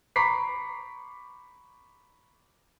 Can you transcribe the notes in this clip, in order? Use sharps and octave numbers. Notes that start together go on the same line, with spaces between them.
A#5 B5 C#6 D6 B6 C7